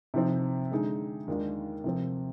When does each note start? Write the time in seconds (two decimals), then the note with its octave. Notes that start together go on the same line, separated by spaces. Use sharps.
0.14 C3 F3 C4 D#4
0.71 D3 G#3 D#4 G#4
1.28 D#2 D#3 G#3 D4 F4
1.84 C3 F3 C4